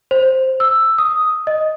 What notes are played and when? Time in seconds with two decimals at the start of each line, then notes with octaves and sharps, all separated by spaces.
0.11 C5
0.60 E6
0.98 D#6
1.47 D#5